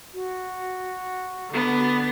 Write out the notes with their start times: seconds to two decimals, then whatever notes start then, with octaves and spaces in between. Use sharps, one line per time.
0.14 F#4
1.50 D3 B3